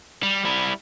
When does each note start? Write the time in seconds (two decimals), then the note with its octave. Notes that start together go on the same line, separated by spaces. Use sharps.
0.23 G3
0.45 G3 E4